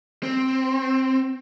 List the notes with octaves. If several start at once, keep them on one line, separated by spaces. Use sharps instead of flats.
C4